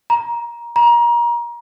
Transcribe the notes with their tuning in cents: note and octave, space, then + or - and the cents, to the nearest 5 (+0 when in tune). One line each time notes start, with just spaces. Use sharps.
A#5 +20
A#5 +30